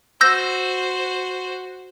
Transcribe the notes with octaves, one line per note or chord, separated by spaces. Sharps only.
F#4 C5 E6 G6 A#6